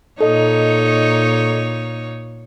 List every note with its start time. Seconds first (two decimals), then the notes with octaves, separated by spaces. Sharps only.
0.21 A#2 D#4 A4 C#5 D#5